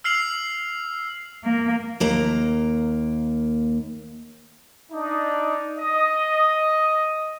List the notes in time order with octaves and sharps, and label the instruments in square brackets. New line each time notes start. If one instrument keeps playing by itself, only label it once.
[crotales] E6 F6 C7 F7 F#7
[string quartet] A#3
[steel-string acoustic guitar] D#2 A#3 A#5
[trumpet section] D4 D#4
D#5